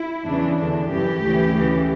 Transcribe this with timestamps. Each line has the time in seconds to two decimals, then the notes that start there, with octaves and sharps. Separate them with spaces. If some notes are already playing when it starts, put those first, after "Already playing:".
Already playing: E4
0.25 E2 C#3 E3 D4
0.57 E2 D3 D4
0.89 F#2 C#3 E3 G4
1.21 D2 C#3 E3
1.53 D2 C#3 E3